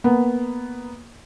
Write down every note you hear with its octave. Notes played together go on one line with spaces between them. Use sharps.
A#3 B3